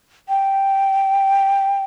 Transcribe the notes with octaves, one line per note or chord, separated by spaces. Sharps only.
G5